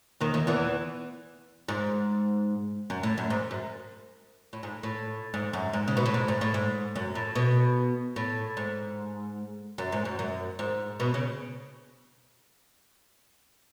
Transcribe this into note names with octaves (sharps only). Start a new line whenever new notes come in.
D#2 D#3
D#2 D#3
E2 E3
G#2
F#2
A2
F#2
G#2
F#2
A2
G#2
A2
G#2
F#2
G#2
C#3
B2
A2
G#2
G#2
A2
G#2
F#2
A2
B2
A2
G#2
F#2
G#2
F#2
F#2
G#2
B2
C#3